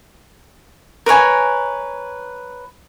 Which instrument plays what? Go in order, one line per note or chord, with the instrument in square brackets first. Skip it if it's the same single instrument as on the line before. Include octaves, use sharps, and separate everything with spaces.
[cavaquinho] A#4 B4 C#5 G#5